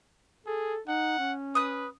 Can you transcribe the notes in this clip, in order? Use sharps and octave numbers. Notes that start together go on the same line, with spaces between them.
G#4 A4
D#4 F#5
C#4
B4 D#6 F#6